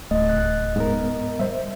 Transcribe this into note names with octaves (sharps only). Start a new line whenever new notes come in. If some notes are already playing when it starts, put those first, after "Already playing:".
D1 A3 D#5
C#2 F#6
G#2 B3 A#4
G3 C5 E5